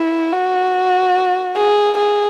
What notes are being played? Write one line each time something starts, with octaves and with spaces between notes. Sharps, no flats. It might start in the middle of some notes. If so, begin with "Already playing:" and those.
Already playing: E4
F#4
G#4
G#4